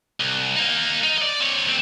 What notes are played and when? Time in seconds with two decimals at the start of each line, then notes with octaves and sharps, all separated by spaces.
0.20 C2
0.56 A#3 D#4
1.04 D#4
1.18 D5 D#5
1.40 C4 C#5
1.67 D2 C4